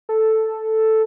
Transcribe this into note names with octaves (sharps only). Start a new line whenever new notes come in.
A4